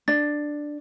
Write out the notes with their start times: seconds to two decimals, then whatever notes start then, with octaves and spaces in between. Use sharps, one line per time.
0.08 D4 A6